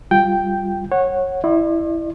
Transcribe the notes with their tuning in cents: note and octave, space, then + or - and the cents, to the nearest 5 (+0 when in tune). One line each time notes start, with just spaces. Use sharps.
G3 +0 F4 +0 G5 +0
C#5 -20 F#5 +0
E4 +0 D5 +45 C6 +40